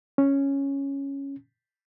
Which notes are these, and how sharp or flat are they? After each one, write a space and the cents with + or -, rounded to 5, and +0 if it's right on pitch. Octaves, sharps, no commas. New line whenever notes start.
C#4 -5